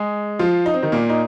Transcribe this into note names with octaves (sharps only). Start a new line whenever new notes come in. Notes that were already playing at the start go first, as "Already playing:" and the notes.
Already playing: G#3 G#4
F3 F4
D#4
C4
D#3 D#4
A#2 A#3
D#4